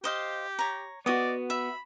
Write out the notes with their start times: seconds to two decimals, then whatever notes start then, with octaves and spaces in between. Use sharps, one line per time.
0.04 G4 C5 D#5 F5
0.59 C#5 A#5
1.06 B3 F#4 D5 D#5 D#6
1.50 E5 B5